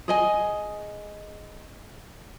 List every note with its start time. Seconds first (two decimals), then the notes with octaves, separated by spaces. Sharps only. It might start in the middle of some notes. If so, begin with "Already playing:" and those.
0.08 G#4 D#5 G#5